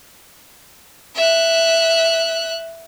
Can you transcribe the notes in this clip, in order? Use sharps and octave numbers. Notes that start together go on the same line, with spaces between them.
E5 F#6